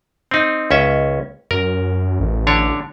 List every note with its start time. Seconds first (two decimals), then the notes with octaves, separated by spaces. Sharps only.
0.31 C4 D#4
0.71 C#2 C#4 E5
1.51 F#2 A#4
2.20 A1
2.47 D3 D4 C#5